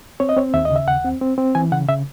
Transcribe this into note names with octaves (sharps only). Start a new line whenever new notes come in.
C4 C#5
D#5
C4 C#5
D#2 E5
C#3 D#5
E5
D#2 F#5
C4
C4
C4
E3 G#5
C#3 F#5
C#3 E5